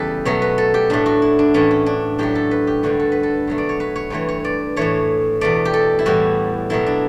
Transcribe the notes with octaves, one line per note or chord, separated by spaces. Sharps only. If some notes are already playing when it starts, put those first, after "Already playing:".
Already playing: E2 C#3 G3 G4 A4 B4
B2 F#3 A3 C#5
B4
A4
G4
A2 F#3 A3 D4
F#4
E4
D4
A2 E3 A3 C#4
C#4
D4
A2 F#3 A3 G4
A4
B4
G4
G2 D3 A3 F#4
A4
B4
A4
B2 F#3 A3
D5
C#5
B4
C#5
G2 E3 A3 C#5
C#5
D5
A2 E3 A3 C#5
E2 B2 A3 D5
G4
A4
E4
A2 E3 G3 F#4
B2 F#3 A3 E4
D4